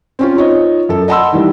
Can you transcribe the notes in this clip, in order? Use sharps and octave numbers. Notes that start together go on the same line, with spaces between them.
C4 C#4 F4
D#4 F4 C#5 D#5
F#2 A4
D#5 F#5 A5 B5 C6 E6
D#3 E3 G3